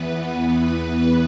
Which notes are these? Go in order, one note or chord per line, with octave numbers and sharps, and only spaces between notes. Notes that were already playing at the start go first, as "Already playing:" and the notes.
Already playing: E2 E3 B3 B4
B4
B4